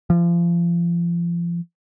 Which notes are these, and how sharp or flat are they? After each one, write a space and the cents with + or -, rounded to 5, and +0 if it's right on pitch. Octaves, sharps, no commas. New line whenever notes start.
F3 -30